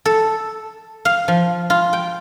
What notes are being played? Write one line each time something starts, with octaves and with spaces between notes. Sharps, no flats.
A4
F5
F3
F4
G5